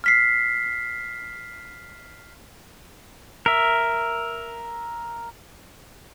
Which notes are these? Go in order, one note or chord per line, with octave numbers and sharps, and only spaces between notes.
F6 B6 C7
A#4 E5